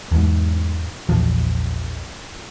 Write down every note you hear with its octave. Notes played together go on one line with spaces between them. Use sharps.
E2 G#2
A#1 E2 F3